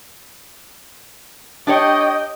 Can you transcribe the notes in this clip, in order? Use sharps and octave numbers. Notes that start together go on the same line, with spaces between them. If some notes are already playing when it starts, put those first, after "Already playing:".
D4 G4 C#5 D#5 G5